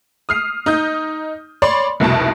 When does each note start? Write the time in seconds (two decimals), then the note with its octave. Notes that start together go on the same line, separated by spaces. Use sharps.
0.29 D#6 F6 C7
0.66 D#4 D#6 G6
1.62 C#5 D5 B5 C6
2.00 F1 C2 B2 A5